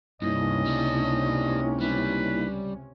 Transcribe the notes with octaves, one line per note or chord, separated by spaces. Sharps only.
C#2 G2 C3 A#3 C#4 D#4 E4 D#5
G3 D4
G3 B4